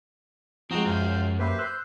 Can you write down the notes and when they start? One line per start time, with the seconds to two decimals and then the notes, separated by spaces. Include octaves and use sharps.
0.71 F3 G#3 C4 F#4 A#5 D#6
0.86 F#2 C5 F5 G5
1.39 A#3 G4 B4 C5 E5 B5
1.59 C5 E6 F#6 G6